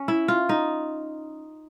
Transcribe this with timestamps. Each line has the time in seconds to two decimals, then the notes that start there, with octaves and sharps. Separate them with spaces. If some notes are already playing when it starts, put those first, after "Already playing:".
Already playing: C#4
0.08 E4
0.28 F4
0.49 D#4